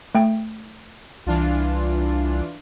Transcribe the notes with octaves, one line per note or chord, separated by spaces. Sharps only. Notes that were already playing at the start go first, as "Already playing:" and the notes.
A3 G5
C2 E3 D4 F4